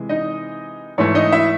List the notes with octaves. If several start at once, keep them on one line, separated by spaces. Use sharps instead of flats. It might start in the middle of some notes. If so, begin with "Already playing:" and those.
Already playing: C3 E3 G#3
D#4 D#5
G#2 E3 A3 C#5
D#4 D#5
E4 E5